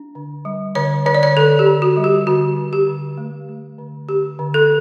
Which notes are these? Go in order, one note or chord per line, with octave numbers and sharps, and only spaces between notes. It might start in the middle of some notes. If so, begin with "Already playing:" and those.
Already playing: D4
D3
G3
D3 C#5
D3 C#5
D5
C#5
D3 A4
G4
D3
F#4
G3
G4
D3 F#4
D3
G4
D3
A3
A3
D3
D3 G4
D3
A4